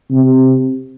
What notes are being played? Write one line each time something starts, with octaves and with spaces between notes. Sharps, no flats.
C3